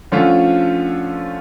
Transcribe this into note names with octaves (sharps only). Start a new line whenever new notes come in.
D3 F3 A3 C#4 F4